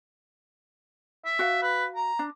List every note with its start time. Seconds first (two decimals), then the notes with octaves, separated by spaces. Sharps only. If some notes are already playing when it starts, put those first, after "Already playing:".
1.25 E5
1.39 F#4 F5
1.62 B4
1.96 A#5
2.19 D4